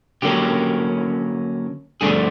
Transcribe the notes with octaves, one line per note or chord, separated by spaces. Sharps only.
D3 F#3 A#3 C#4 G4
G2 D3 F3 A3 D4 G#4